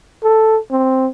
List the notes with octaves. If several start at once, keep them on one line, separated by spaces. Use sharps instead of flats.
A4
C4